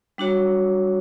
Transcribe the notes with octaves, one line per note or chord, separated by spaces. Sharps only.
G3 D4 F#4 C#5